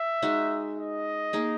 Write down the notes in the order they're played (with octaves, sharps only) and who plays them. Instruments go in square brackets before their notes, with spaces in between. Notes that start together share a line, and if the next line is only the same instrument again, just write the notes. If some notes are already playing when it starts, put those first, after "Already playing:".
Already playing: [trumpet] E5
[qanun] G#3 D#4 F#4
[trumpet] D#5
[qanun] A#3 D#4 G#4